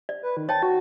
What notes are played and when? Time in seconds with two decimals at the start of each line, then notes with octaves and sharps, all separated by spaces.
0.09 D5
0.23 B4
0.37 D#3
0.49 C#5 G5 A5 A6
0.63 F#4